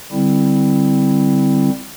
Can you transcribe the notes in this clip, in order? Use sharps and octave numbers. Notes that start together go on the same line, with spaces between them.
D3 G3 C4 E4